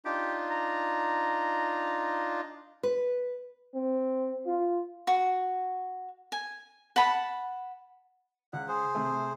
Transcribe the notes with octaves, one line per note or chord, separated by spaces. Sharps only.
D4 D#4 F4 G4
A#5
B4
C4
F4
F#4
G#5
F#5 A5 B5
C#2 F#5
G#4 C5
C3 A3